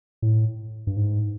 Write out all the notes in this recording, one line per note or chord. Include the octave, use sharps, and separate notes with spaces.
A2
G2
G#2